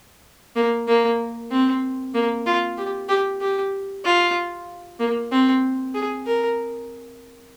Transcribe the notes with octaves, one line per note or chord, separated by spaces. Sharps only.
A#3
A#3
C4
A#3
F4
G4
G4
G4
F4
A#3
C4
G#4
A#4